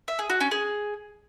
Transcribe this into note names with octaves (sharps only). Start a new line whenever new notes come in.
E5
G#4
F#4
C#4
G#4